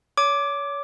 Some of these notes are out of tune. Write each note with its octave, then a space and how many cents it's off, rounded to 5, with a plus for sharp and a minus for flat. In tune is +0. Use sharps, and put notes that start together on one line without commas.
C#5 +30 D6 +0